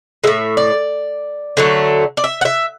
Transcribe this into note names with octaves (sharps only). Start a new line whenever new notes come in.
A2 G#3 E5
D5
D3 F#3 A3
D5
E5
F#5
E5